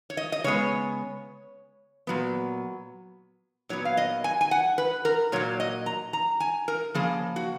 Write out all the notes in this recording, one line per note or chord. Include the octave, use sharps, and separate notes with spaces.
C#5
D#5
D#5
C#3 G#3 B3 C#5
A#2 F#3 B3
A#2 F#3 B3 C#5
F5
D#5
G#5
G#5
F#5
B4
A#4
A#2 F#3 A#3 C#5
D#5
A#5
A#5
G#5
A#4
C#3 F3 A#3 G#4
F#4